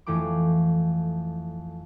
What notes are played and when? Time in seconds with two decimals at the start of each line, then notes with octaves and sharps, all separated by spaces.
0.06 F2 E3 A3 G5 D6